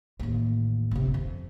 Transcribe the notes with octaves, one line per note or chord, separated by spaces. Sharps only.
A1 D#2
G1 C3
F2